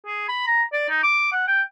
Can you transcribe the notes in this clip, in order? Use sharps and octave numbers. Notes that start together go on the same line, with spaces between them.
G#4
B5
A#5
D5
D#4
D6
F#5
G5